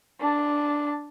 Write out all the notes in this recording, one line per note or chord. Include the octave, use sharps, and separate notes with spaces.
D4 A5